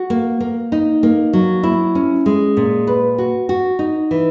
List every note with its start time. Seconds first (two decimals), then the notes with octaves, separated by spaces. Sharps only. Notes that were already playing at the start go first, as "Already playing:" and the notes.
Already playing: F#4
0.10 A#3
0.40 A#3
0.72 D#4
1.03 A#3
1.33 F#3
1.63 E4
1.95 C#4
2.26 G#3
2.57 A#2
2.87 B4
3.18 F#4
3.49 F#4
3.79 D#4
4.11 E3